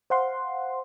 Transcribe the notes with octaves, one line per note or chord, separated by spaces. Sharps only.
C5 F5 F#5 C6